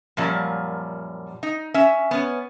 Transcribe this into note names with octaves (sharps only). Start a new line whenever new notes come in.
F#2 A#2 F3 G3
D#4
C#4 E5
B3 C#4